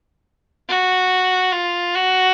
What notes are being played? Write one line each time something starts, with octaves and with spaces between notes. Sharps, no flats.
F#4
F4
F#4